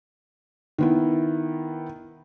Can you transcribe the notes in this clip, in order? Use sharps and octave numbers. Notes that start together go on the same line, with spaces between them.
D#3 B3 E4